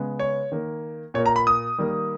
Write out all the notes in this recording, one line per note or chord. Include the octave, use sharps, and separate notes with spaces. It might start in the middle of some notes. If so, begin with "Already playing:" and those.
Already playing: C#3 G#3 B3
C#5
D#3 A#3
A#2 A#3 C#5
A#5
B5
D#6
D#3 G3 A#3